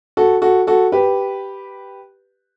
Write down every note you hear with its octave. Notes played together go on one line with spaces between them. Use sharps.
F#4 A4
F#4 A4
F#4 A4
G4 B4